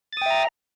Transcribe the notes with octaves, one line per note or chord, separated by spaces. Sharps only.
E5 G5 A#5 D#6 A6